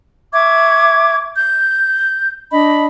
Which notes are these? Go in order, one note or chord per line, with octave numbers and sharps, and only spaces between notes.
E5 C#6 D6 G#6
G6
D4 D#5 B5